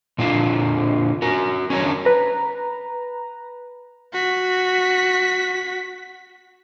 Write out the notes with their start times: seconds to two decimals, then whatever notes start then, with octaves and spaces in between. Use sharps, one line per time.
0.18 A#2 D3 C4 D4 F4
1.22 F#4 A#4
1.70 C#4 D4 A#4 C#5
2.05 B4 A#5
4.13 F#4 B6